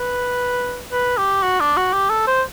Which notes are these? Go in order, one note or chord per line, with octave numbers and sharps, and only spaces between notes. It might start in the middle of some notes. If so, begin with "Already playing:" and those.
Already playing: B4
B4
G4
F#4
D4
F#4
G4
A4
C5